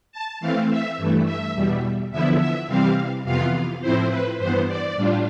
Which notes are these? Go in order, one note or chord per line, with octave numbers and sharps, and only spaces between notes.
A5
E3 A3 C4 F5
E5
G2 E3 A3
E5
E2 B2 G3
E2 D3 F3 B3 E4 E5
E5
C3 E3 G3 C4 F5
F2 C3 E3 B3 F4 F5
A2 F3 C4 E4 C5
B4
G2 E3 B3 C5
D5
A2 G3 D4 F4